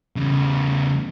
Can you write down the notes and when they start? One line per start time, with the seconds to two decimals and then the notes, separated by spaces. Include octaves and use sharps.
0.16 E2 C#3